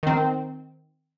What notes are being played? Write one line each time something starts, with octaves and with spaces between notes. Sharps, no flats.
D#3 C4